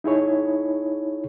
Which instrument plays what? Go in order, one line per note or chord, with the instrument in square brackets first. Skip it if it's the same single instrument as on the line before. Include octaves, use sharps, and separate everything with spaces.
[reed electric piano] D#4 E4 G#4 C#5